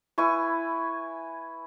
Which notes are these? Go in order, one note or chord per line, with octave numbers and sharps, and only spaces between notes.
E4 B4 G#5 C#6